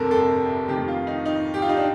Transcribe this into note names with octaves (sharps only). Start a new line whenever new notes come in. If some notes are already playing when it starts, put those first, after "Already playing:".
Already playing: G1 F2 C3 G3 A4 A#4
A4
F2 D#3 A3 G4
F4
D#4
D#4
G4
F4
D#4
D4